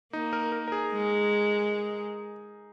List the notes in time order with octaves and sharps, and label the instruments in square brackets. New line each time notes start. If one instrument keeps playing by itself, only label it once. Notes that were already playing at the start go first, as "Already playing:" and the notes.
[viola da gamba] A#3 [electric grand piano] D#4
[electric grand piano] A#4
A#4
A#4
G#4
[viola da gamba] G#3